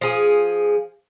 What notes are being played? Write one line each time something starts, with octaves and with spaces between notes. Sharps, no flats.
F3 G#4